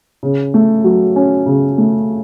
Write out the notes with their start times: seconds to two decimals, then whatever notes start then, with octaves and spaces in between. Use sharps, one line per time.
0.23 C#3
0.54 A3
0.84 F#3
1.16 C#4
1.46 C#3
1.78 A3